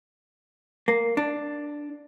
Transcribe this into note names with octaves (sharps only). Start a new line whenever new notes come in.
A#3
D4